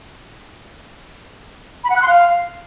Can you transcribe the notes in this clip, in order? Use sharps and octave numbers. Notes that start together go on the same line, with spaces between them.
B5
F#5
F#6
C6
F5